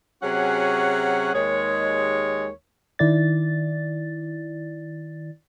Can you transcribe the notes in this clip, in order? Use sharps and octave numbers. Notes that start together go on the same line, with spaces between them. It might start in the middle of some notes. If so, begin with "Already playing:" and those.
C3 F#3 C#4 F#4 G#4 F#5
D#2 G#3 C#5
D#3 E4 D5 A6